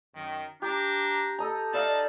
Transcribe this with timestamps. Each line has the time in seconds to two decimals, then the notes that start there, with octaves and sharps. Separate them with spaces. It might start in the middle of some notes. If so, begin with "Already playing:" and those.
0.15 F#2 D#3
0.62 D4 G4 A#5
1.39 A4 D#5 A#5
1.73 D#4 D5 E5 F5 A5 D#6